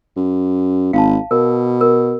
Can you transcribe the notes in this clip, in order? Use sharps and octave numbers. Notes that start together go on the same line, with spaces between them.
F#2
G#1 F5 A5
B2 A#4
A#4